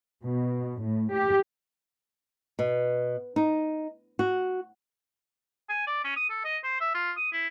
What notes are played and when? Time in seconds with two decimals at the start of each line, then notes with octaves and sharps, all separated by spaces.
0.24 B2
0.81 A2
1.12 G4
2.59 B2
3.36 D#4
4.19 F#4
5.69 G#5
5.87 D5
6.04 C#4
6.17 D#6
6.30 A4
6.45 D#5
6.64 C5
6.81 E5
6.94 F4
7.17 D#6
7.32 E4